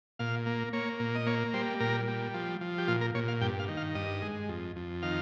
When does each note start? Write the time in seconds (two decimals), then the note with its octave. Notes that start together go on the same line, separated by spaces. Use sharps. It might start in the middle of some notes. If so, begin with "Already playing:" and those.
0.19 A#2 F5
0.46 A#3
0.73 A#3 C#5
1.00 A#2
1.15 D#5
1.26 A#3 C#5
1.53 G3 C5
1.80 A#2 A#4
2.07 G3
2.34 F3
2.61 F3
2.78 G4
2.88 A#2 F4
3.01 A#4
3.15 A#2 C#5
3.28 F5
3.41 G2 G5
3.59 F5
3.68 D#3
3.77 F5
3.95 G2 D#5
4.22 G#3
4.49 F2
4.76 F2
5.02 D#3 F5